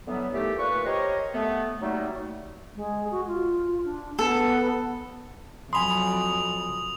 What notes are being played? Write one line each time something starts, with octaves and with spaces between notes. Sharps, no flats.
D3 E3 F#3 G3 B3
A#2 E3 A3 D#4 G4 A4
A#2 B4 C#6
G4 A#4 C5 C#5 D#5
A3 B3
F#3 G3 A3 A#3 D#4
G#3
F#4
F4
D4
B3 A4
F2 F#3 G#5 B5 C6 D#6 F7